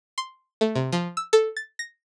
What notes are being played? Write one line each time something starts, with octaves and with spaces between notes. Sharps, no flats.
C6
A3
C3
F3
E6
A4
A6
A#6